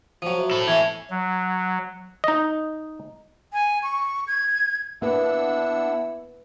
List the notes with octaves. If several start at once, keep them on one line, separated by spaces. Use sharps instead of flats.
F3 F#3 D#7
F#4 C5 E5
E4 A4
E3 C#4 E5 G#6
F#3
D#4 D#5
G#5
C#6
G#6
A#3 B3 D4 E4 B4 F#5 E6